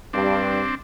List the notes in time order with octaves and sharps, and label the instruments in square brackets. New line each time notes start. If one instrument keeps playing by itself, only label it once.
[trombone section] G2 [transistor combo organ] C4 D4